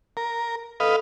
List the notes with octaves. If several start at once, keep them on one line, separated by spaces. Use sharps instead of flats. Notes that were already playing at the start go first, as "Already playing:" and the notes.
A#4
A4 B4 D#5 F5